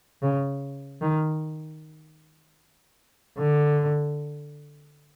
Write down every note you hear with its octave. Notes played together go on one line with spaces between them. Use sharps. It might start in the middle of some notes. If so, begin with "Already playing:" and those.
C#3
D#3
D3